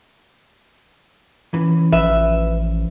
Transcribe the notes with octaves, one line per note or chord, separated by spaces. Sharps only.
E3 C#4
A1 F3 B4 E5